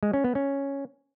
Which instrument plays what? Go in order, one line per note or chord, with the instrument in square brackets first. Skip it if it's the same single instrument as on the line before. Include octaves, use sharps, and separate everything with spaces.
[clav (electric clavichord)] G#3
C#4
B3
C#4